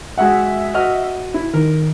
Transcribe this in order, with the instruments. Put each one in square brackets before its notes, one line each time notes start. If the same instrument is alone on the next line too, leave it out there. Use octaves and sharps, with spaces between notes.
[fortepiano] G#3 F#4 F#5 [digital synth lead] E5
[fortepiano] F#4 D#5 F6
E4
[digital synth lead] D#3 [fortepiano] A#4